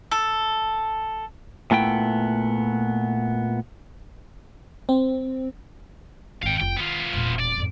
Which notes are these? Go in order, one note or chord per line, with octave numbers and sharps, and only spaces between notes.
A4
A#2 A3 B3 E4 G5
C4
G#1 D#3 F5 G5
F1 F4 G5
D#3 B3 F4
E1 A#2
D5
F2 G#2